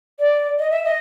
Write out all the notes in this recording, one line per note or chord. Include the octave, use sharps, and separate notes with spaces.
D5
D#5
E5
D#5